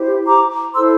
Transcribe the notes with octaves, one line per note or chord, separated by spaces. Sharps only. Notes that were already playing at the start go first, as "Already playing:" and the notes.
Already playing: E4 G4 C5
A#5 D6
E4 A4 C5 C6 E6